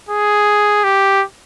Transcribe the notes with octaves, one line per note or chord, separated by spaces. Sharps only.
G#4
G4